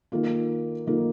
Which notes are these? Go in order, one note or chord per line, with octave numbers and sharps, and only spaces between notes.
D#3 A#3 F4
D#3 A#3 F4